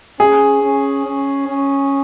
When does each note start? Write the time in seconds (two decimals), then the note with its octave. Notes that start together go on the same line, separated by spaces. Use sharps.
0.19 C#4 G#4
0.62 C#4
1.06 C#4
1.48 C#4